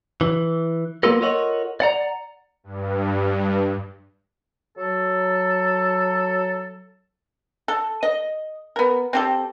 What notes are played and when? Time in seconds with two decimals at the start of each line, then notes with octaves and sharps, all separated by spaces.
0.21 E3
1.03 A#3 B3 F4 A4 A#4
1.21 F4 A4 A#4 C#5 D#5 F#5
1.80 D5 F#5 A#5
2.64 G2
4.78 F#3 A4
7.68 A4
8.03 D#5
8.76 B3 A#4
9.13 C4 G4 A4